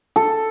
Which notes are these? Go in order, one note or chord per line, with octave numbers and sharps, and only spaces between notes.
A4